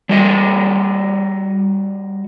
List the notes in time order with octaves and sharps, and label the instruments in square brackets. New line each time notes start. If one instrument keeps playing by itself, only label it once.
[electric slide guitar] G3 F#4 D#5